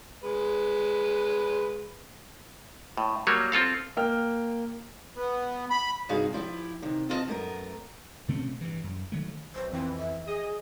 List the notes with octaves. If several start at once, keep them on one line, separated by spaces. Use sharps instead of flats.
G#3 B4
A2
F#3 G3 A#3 C#5
C4 F4 A4 F5
A#3 G5 F6
B3
B5
G2 C3 D#4 F#4 G#4 F5
F3 E4 F#4 G4
C3 D#3
C4 F4 F#4 C#5 D#5 A5
F#2 A3 B3 A#4
B2 A3 C4 C#4
G2 E3
F#2
D#3 F#3 A3
B1 C5
F2 E3 C4
E5
G#4 D#5